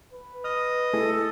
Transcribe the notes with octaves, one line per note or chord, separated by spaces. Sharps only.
B4
D#5 D#6 F6
A3 E4 G#4 A4